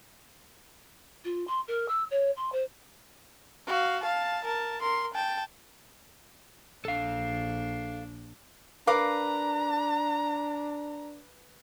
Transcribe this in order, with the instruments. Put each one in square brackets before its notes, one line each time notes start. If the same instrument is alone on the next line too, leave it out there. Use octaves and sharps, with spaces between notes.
[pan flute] F4
C6
A#4
E6
C#5
C6
C5
[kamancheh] F#4 F5
F5 A5
A#4 A5
A#4 C6
G5 A5
[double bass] A#1 [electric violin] D4 [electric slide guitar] A4 F5
[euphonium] D4 [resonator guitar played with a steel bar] A#4 F5 [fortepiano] B4 D6 [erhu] A#5